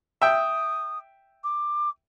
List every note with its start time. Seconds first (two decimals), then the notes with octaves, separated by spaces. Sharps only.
0.22 E5 G5 D#6
1.44 D6